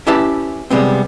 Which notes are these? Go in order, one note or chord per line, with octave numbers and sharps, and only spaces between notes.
C#4 E4 G4 B4 E5 A5
C3 G3 G#3 B3 C4